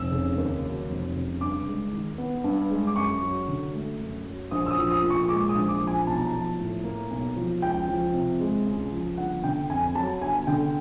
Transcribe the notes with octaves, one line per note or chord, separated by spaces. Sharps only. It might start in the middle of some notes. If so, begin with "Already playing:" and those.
Already playing: F1 E6
C#3
D#2
F#3
F1
C#3
G2 D6
G#3
D#3
B3
G2
G#3
D6
F#2 C#6
F#3
D3
A3
F#2
F#3
A#1 D#6
E6
D#6
F3
D#6
A#2
C#6
G#3 D6
D#6
A#1
D6
F3
G#5
B1 A5
A#5
A5
F3
A2
A#3
B1
F3
C#2 G5
F3
C3
G#3
C#2
F3
G1 F#5
D3 G5
F2 G#5
F#3 A5
G1 G#5
D3 G5